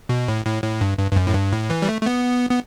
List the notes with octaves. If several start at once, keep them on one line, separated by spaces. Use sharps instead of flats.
B2
A2
A2
A2
G2
G2
G2
F#2
A2
G2
A2
E3
G3
A3
A3
B3
B3